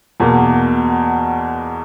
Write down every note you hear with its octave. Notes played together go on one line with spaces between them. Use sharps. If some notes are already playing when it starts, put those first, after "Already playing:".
E2 B2 A#3